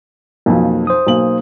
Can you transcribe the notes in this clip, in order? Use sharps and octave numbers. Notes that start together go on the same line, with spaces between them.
B1 F2 A#3 F4 F#4
C5 D#6
B1 A#3 F#7